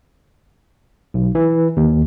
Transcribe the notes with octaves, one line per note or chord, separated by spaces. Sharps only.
B1
E3
D#2